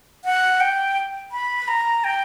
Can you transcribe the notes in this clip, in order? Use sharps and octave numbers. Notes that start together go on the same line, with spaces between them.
F#5
G5
B5
A#5
G5